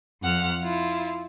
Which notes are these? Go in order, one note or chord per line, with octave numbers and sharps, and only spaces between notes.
F2 F#5 F6
E4 F4